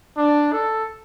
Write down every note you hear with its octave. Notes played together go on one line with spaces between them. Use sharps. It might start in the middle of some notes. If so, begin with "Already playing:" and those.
D4
A4